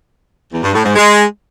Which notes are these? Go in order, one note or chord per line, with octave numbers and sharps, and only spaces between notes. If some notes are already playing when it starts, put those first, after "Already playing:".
E2
G2
A2
G#2
G#3